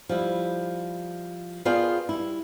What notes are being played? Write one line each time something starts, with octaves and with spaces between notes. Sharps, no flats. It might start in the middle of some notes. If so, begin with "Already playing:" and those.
F3 G3 E4
B3 F4 G#4 A#4 D5 G5
G3 E4